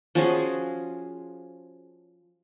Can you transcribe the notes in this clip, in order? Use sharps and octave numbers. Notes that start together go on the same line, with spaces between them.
F3 C#4 F#4 G#4